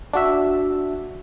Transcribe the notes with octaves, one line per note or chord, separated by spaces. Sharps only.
D4 F#4 E5